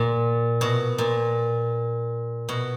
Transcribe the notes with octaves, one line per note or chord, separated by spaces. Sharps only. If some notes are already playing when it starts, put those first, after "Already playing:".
Already playing: A#2
B2
A#2
B2